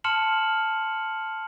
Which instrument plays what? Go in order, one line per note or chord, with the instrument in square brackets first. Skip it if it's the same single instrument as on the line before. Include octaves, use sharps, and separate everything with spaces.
[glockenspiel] A5 C6 F6 C#7 E7 F#7